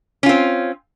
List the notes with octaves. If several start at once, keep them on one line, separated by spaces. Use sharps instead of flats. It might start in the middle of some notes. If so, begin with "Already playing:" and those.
C4 C#4 F4